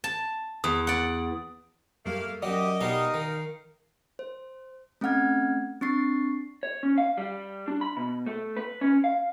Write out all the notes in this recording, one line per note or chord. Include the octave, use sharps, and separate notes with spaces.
A5
E2 D#6
D5 F#5
F#2 G3 A3 A#3 F5
F#2 F#3 G4 D5 D#5 D6
B2 G3 B3 D#4 A#4 F5
D#3
C5
A3 C4 C#4 F#5 F6 G#6
C4 D4 C#6 A6 C7
C#5
C#4
F5
G3
D4
B5
B2
A3
B4
C#4
F5